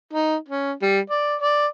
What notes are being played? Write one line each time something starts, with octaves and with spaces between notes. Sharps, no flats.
D#4
C#4
G3
D5
D5